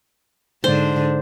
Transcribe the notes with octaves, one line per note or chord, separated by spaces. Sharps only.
G#2 D3 D4 C5